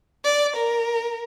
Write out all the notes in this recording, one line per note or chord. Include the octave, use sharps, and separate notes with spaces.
D5
A#4